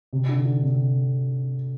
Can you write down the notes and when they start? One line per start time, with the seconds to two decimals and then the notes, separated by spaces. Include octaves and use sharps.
0.13 C3
0.29 D3
0.46 D3
0.63 C3